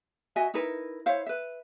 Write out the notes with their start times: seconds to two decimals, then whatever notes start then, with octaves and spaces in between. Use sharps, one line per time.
0.36 F#4 D#5 E5 G#5
0.54 D#4 E4 A#4 B4
1.06 E4 C5 C#5 F5
1.26 B4 E5